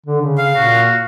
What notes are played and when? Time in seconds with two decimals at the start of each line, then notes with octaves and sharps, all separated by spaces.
0.06 D3
0.22 C#3
0.38 F5
0.56 A#2 F#4